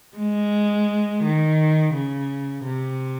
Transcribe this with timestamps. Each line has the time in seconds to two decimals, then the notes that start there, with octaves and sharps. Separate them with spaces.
0.17 G#3
1.24 D#3
1.95 C#3
2.64 C3